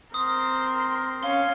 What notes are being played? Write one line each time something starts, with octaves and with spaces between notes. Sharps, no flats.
C4 A#4 C6 D#6
C#4 F5 G7